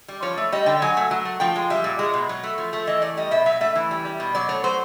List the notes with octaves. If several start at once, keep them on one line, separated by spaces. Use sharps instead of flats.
G3
F3 C#5
A3
G3 D#5
D3 G5
F#3 G#5
A3
F#3
A3
F3 G5
G#3
G3 E5
A#2
G#3
B2
F#3
A3
F3
A3
E3 D#5
A3 D5
G3 D#5
B2 E5
F#3 E5
A3 E5
E3
G3
G3
B2
F#3 D5
A3 C#5
F#3 C5